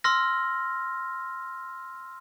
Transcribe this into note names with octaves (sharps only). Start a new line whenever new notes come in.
C6 E6 F6 A#6